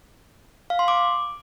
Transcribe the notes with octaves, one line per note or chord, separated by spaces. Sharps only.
F5
C6
D6